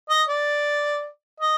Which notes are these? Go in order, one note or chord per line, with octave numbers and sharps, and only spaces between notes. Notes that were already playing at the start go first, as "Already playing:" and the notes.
D#5
D5
D#5